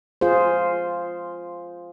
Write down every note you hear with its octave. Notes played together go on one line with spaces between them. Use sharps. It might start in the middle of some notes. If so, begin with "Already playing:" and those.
F4 G#4 C5